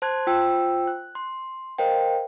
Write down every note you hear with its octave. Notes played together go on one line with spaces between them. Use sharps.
C5 A5 C6 F#6 G#6
F4 C5 G5 E6
F#6
C6
A#4 C5 D#5 F5 G5